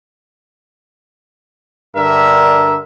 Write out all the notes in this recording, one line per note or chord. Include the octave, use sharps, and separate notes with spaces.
G2 D3 A#4 E5